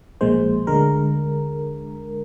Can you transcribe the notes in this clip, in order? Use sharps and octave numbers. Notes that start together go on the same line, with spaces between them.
A#1 A#2 F3 G#3 C5
D2 D3 G#3 A#4